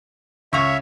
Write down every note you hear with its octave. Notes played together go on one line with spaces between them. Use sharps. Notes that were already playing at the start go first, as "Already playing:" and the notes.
C#2 C#5 E5 F5 C#6